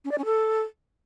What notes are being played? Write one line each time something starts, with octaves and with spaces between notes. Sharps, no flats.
C#4
D5
C#4
A4